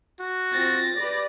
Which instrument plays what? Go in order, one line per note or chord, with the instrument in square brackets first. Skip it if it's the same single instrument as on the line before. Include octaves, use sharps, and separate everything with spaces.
[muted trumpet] F#4
[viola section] C4 F4 [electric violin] A6 A#6
[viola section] G4 B4 D5